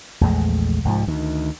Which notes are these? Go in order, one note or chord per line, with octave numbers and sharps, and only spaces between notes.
A#1 E2 G#3 A3
C2 G#2 F3
D2 D#3